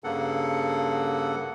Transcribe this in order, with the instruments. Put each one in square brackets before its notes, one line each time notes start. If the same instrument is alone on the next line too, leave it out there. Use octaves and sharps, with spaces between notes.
[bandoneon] G2 C#3 A#3 A4 F#5